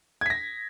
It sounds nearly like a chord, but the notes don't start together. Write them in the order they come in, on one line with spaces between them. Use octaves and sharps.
G#6 B6 A#6